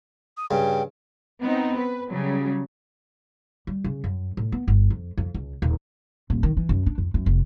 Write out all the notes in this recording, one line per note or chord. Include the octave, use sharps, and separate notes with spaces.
D#6
G2 C#3 G5
B3 C4 D#4
B4
C#3 F#3 G3
G3
C#3
F#2
A2
B3
G1
F2
F2
C#2
D#1
D#1
D#3
E3
F#2
D4
F2
F#2
F1